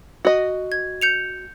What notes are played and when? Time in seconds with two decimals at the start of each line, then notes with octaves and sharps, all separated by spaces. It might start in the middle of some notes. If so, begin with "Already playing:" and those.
0.25 F#4 D#5
0.72 G#6
1.02 G6 C#7 F7